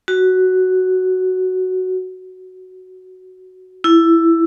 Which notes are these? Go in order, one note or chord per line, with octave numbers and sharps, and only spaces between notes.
F#4
E4